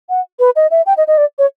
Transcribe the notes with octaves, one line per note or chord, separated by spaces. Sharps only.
F#5
B4
D#5
E5
G5
D#5
D#5
D5
C#5